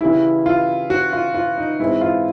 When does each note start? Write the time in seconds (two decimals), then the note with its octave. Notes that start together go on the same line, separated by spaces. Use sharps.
0.01 C#3 E3 G3 E4
0.46 F4
0.90 F#4
1.13 F4
1.35 F4
1.58 D#4
1.80 G#2 E3 G#3 C4 E4
2.01 F4